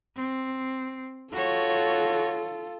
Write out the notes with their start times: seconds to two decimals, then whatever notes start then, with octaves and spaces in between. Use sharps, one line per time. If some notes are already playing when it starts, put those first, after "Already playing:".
0.16 C4
1.33 F4 F#4 A4 C#5